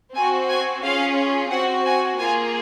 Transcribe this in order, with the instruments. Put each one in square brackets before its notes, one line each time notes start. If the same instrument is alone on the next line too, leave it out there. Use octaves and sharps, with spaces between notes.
[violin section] C4 F#4 G#5
G#5
C#4 F4 G#4 F5
C4 F#4 F#5
G#5
A#3 F4 G#4 G#5